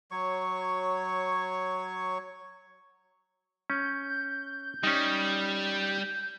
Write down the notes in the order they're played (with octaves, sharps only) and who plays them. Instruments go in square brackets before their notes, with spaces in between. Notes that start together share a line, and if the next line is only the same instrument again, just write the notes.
[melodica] F#3 C#5 C#6
[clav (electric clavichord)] C#4 [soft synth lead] G6
[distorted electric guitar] G3 [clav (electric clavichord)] C#4 D#4